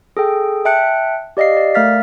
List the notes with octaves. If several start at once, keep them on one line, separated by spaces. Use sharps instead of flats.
G#4 A4 G5
E5 G5 A5 F#6 C#7
G4 D5 D#5 F5 C7
D5
A3 A#4 F5 F6 A6 B6